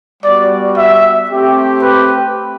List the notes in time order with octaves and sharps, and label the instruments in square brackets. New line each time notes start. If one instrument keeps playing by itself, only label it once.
[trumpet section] G3 B3 F#4 D5
E5
A3 C4 G4
B4